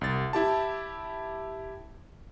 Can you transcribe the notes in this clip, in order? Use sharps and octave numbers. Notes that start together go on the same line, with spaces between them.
C2 A6
E4 G4 A5